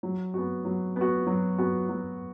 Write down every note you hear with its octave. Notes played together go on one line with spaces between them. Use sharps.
F#3
B3 F#4
F#3
B3 F#4
F#3
B3 F#4
F#3